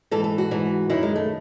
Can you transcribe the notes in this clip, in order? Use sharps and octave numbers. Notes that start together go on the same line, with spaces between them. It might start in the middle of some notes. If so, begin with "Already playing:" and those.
G#2 E3 A4
A4
F#4
G#2 E3
F#2 D#3 E4
G#3
A3